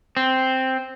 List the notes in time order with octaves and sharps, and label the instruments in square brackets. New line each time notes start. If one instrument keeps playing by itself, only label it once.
[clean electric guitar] C4